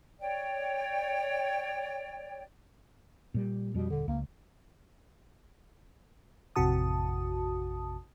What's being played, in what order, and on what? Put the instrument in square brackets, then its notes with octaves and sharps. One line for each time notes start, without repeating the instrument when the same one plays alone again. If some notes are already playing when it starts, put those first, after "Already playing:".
[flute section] C#5 D5 G5
[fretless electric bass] A#2 G3
[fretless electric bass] F2 G3 [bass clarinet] B2
[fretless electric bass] D#1 [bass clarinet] D3
[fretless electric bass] C#2 [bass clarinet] A#3
[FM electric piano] A1 F2 C3 F#4 A5 D#6